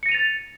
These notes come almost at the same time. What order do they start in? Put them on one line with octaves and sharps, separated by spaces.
C#7 A#6 D#7 F7 A6